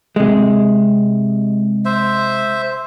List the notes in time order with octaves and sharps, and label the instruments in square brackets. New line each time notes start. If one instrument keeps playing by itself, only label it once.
[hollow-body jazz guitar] C3 G#3
[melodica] C5 E5